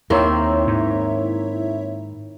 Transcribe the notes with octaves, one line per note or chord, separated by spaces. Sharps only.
D#2 D#3 A#3 C4 E4 C#5 E5
G#2